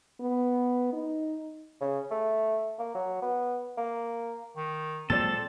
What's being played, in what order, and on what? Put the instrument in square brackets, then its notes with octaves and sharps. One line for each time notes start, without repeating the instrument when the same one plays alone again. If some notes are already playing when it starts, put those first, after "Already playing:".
[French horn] B3
D#4
[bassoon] C#3
A3
A#3
F#3
B3
A#3
[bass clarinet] D#3
[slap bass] A#2 F#3 G#3 [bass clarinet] C4 [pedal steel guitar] A4 [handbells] D5 A6